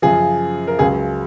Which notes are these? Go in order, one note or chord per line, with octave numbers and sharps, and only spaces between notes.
F#2 C#3 F3 G#4
A#4
C#2 C#3 F#3 G#4